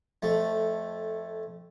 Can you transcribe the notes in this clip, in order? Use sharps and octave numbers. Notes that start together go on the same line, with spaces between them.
F2 A3